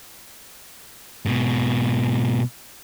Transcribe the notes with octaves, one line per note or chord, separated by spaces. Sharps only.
G#2 B2